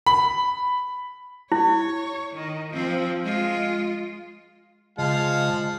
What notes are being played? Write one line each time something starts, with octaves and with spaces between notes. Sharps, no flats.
B5
E4 C#5
D#3
F3 C4
G#3 F4
C#3 F3 G#3 D#5 F5 A5